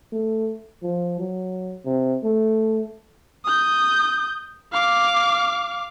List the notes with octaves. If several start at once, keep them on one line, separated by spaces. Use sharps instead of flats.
A3
F3
F#3
C3
A3
D#6 G6
F5 D6